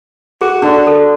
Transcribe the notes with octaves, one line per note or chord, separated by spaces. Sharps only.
F#4 G#4
D3
A4